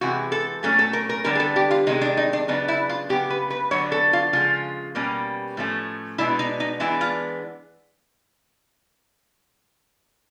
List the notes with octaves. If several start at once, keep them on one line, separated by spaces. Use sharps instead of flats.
C3 E3 G#3 F#4
A4
A#2 F#3 A3 C#4 A4
A4
A#4
A#4
D3 G3 B3 D4 A#4
G#4
A4
G4
F4
C3 D#3 G#3 D#4
D4
D#4
D4
C#3 F#3 B3 D4 D#4
E4
F4
C#3 F#3 B3 G4
B4
B4
D3 F#3 B3 D4 C#5
A4
F4
C#3 F3 G#3 F4
B2 G3 A#3 C#4
A2 F3 A3 C#4
B2 G#3 B3 D4 E4
D#4
D#4
E3 G#3 B3 D4 E4
F4